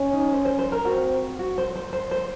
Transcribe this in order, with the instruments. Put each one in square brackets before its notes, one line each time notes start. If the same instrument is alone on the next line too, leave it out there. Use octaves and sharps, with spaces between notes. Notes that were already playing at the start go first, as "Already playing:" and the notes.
Already playing: [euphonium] C#4
[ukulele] D#4
C5
C5
C5
A#4
[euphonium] C4 [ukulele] F#4
[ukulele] F#4
C5
C5
C5
C5